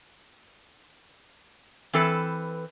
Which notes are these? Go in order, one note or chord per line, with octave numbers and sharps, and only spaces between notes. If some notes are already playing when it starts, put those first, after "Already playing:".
E3 C4 A4 B4